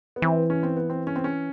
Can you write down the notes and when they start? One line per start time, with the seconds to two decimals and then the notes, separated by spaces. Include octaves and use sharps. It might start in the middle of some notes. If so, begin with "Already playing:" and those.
0.16 B3
0.22 E3 C4
0.50 C#4
0.63 C4
0.76 B3
0.90 C4
1.07 C#4
1.16 C4
1.24 C#4